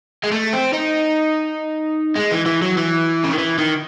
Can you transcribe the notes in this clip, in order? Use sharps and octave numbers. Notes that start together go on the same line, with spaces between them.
G#3
A3
C4
D#4
G#3
E3
E3
F#3
E3
C#3
D#3
E3
D#3